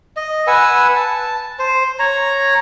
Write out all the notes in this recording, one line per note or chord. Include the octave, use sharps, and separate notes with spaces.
D#5
B4 F#5 G#5 E6
A5
C5
C#5 A#5